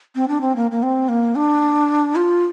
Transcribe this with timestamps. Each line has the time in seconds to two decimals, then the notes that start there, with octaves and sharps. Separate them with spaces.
0.15 C4
0.28 D4
0.41 C4
0.56 A#3
0.71 A#3
0.83 C4
1.09 A#3
1.35 D4
2.16 F4